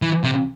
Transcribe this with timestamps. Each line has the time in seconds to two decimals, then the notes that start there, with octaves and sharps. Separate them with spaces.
0.02 E3
0.24 C3